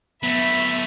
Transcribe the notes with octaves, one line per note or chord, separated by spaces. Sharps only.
F#3 A3 B3 E5 B5